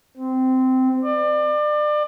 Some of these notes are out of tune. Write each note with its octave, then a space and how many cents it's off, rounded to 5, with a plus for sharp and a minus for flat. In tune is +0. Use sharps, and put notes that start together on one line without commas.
C4 -15
D5 +30